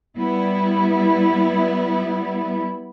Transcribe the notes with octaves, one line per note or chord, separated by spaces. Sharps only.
G3 B3 E4